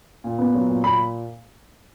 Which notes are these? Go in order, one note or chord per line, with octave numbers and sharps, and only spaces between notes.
A#2
B3
F#3
A#2
A#2 B5